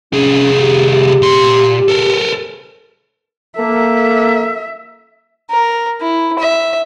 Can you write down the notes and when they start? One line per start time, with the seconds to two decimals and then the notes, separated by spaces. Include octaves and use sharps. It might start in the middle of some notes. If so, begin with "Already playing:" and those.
0.13 C2 C#4 G#4
0.60 G4
0.91 G4
1.22 A#2 C6
1.88 A4 A#4
3.58 A#3 A4 E5
5.50 A#4
6.01 E4
6.39 E5